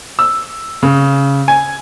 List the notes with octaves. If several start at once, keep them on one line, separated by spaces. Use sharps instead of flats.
E6
C#3
G#5